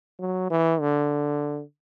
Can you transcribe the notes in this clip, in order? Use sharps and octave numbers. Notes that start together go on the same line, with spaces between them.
F#3
E3
D3